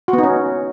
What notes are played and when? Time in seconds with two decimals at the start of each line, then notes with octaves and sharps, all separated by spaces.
0.08 F#4
0.13 B3
0.18 D#4
0.23 C#4